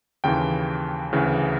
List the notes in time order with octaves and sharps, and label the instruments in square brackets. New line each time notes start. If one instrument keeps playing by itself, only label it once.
[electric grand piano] D#2 C#3 E3 G5
D2 C#3 E3